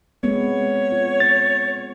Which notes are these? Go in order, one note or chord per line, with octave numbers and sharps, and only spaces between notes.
G#3 B3 C4 C#5
F4
A6